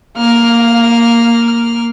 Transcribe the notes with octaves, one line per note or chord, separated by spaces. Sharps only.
A#3 F5 F6